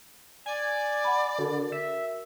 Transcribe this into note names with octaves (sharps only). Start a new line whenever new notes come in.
D5 G#5
F#5 B5
D3 F#4 A#4
E5